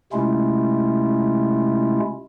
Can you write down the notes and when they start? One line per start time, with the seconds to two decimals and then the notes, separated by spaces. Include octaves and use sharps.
0.13 C3 G#3 A3 C#4 E4 F4